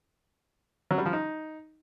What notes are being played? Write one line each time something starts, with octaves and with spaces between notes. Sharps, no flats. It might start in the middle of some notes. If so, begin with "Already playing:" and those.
F#3
G3
F3
D#4